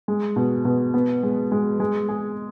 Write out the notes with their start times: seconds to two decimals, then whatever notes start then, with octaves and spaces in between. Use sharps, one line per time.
0.08 G#3
0.36 B2
0.65 B2
0.94 B3
1.23 G#3
1.52 G#3
1.80 G#3
2.09 G#4